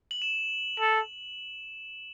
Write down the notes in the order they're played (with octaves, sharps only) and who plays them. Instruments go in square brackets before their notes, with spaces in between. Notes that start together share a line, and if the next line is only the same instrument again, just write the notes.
[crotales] F#7
E7
[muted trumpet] A4